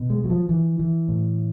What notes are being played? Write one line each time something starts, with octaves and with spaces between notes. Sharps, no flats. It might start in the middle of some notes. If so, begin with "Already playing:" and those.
Already playing: B2
G#3
F#3
F3
E3
E3
A2